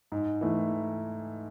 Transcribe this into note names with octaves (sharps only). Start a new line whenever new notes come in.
G#2
E3 A3